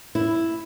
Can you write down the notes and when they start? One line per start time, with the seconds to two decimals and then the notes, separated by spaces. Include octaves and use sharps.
0.15 E4